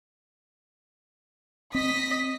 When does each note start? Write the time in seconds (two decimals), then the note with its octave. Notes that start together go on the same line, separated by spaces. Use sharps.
1.75 C4 D#5 B6